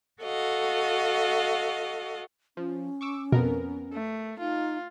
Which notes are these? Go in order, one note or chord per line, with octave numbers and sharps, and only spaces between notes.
F#4 A4 D#5 F5
F3 C#4
C#6 D6 E6
F2 B2 B3 A#4
A3
D#4 F4